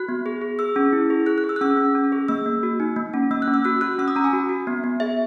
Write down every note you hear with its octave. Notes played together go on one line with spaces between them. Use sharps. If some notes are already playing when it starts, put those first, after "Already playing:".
Already playing: F#4 F#6
B3
G#4
G#4
G#4 E6
C#4
E4
G#4
G#4 F#6
F#6
G#4
E6
F#6
C#4 E6
C#4
C#4
G#4
A#3 E6
A#3
F#4
D#4
A#3
C#4
A#3 E6
F#6
C#4
E6
F#4 F#6
F#4 F#6
C#4 E6
D#6
C#4 A#5
G#5
F#4
F#4
B3
B3
G#4 E5